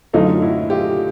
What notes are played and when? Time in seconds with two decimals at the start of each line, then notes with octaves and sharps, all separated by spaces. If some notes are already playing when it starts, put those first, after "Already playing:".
0.13 F#2 D3 F#3 A3 D#4 F4
0.42 E4 F#4
0.70 F4 G4